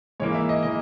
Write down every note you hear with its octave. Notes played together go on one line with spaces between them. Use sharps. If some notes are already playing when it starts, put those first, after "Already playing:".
G#2 E3 A#3 C#5
E5
D#5
E3 A#3 D#5